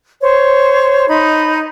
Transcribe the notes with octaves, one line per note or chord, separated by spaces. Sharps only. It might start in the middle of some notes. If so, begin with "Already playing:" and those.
C5 C#5
D#4 B5